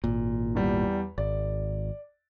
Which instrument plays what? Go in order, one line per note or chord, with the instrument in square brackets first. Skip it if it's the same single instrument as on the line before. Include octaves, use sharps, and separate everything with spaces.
[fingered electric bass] G#1 A#2
[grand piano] E2 G3
[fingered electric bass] G#1 [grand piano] D5